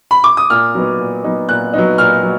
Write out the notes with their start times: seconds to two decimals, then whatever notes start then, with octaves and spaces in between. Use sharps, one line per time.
0.11 B5
0.24 D6
0.37 D#6
0.50 A#2 F6
0.75 F#3 B3 D#4
1.00 A#2
1.24 F#3 B3 D#4
1.49 A#2 F#6
1.73 F#3 B3 D#4
1.98 A#2 F6
2.23 F#3